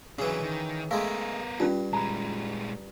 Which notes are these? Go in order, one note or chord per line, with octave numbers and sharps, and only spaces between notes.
C#3 E3 F#3 D4
D#3
G#3 A3 B3 A#4 F5 C6
G2 C#4 F4
A#2 G#3 A#5 B5